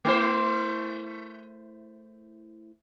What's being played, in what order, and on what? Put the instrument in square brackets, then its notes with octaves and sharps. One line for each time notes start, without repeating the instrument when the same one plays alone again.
[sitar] A3 E4 C5